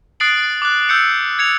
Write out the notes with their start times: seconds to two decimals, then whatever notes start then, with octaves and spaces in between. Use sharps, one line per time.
0.20 D#6 F#6 A6 C7 D7 F#7
0.62 D6 F#6
0.89 E6 G6 C#7
1.39 G#6 C#7 F7